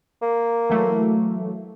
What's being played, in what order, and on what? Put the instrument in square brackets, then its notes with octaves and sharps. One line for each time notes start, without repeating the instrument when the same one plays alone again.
[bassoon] A#3
[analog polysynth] E3 F#3 A3